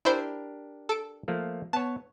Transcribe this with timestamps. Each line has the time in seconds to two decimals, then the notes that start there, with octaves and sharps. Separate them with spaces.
0.05 D4 E4 G4 A#4 C5
0.89 A4 D7
1.28 F3 A3 A#3
1.73 B3 C#5 A5